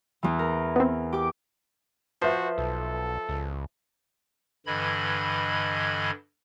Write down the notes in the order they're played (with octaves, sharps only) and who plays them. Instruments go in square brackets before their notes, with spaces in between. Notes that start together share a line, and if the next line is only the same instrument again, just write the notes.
[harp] E2 E3
A#4
[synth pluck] B3 C4
[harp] G4 D6
[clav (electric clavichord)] F3 C5 [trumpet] F#4 [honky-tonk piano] B4 E5
[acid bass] B1 [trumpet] A4
[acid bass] C#2
[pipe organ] G2 D3 E3 D#5 B5 G#6